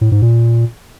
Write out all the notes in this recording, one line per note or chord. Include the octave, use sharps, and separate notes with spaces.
A2
G#2
A#2